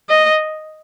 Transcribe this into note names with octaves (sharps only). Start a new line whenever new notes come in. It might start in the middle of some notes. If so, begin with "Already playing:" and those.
D#5